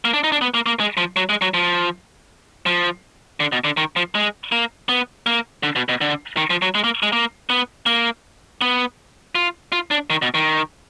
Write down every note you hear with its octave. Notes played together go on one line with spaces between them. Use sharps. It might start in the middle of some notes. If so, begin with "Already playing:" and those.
A#3
D4
D#4
D4
B3
A#3
A#3
G#3
F3
F#3
G#3
F#3
F3
F3
D3
B2
D3
D#3
F3
G#3
A#3
B3
A#3
D3
B2
B2
D3
D#3
F3
F#3
G#3
A#3
G#3
A#3
B3
A#3
B3
F4
F4
D4
D#3
B2
D#3